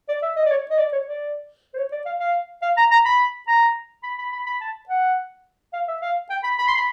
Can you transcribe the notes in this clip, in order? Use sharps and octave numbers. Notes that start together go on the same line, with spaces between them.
D5
E5
D#5
D5
C#5
D#5
D5
C#5
D5
C5
C#5
D5
F5
F5
F5
A#5
A#5
B5
A#5
B5
B5
B5
B5
A5
F#5
F5
E5
F5
G5
B5
B5
C6
B5